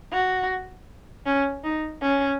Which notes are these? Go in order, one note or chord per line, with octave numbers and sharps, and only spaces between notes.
F#4
C#4
D#4
C#4